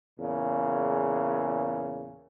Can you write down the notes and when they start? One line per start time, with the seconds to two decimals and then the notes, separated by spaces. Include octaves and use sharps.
0.19 E2 A#2 C#3